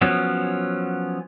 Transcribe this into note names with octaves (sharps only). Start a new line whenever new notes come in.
F3 F#3 B3 C#4